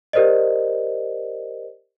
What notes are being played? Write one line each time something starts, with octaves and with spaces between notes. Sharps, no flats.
G4 A#4 C5 D5 D#5